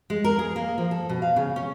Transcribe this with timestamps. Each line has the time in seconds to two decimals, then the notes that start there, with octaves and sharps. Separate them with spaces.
0.10 G#3
0.24 A#4
0.39 G#4
0.56 A#3
0.78 F3
0.91 A4
1.09 B2
1.22 F5
1.36 C#3
1.56 C#4